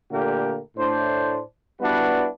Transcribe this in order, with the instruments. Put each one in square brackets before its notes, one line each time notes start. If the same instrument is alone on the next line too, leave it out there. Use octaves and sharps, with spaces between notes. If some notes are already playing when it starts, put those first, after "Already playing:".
[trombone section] A#2 D3 A3 A#3 G4 A#4
A2 D4 C5
G3 B3 D4 E4 F#4 B4